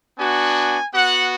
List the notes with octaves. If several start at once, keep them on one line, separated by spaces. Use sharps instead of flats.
B3 D4 F#4 G#5
B3 F#4 F#5